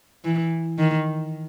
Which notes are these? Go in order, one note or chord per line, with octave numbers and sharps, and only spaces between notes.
E3
D#3